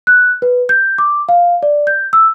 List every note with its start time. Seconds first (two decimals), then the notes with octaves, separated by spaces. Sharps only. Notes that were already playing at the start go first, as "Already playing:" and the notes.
0.07 F#6
0.42 B4
0.69 G6
0.98 D6
1.29 F5
1.63 D5
1.87 G6
2.13 E6